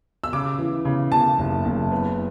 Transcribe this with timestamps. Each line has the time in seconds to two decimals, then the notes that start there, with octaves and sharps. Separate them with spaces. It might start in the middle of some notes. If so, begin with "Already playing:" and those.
0.24 E6
0.33 C#3 D6
0.58 E3
0.85 C#3
1.12 C#3 A5
1.39 F#1
1.65 F#1
1.92 B3